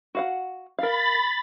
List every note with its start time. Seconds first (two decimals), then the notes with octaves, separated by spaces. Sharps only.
0.15 F#4 F5 F#5
0.79 A#4 F5 B5 A6